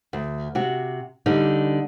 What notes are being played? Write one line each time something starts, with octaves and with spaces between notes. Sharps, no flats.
D2
C3 F#4
D3 G3 D#4